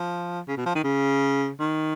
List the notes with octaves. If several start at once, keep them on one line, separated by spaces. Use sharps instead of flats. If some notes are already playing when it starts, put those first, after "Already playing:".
Already playing: F3
C#3
B2
F3
D#3
C#3
D#3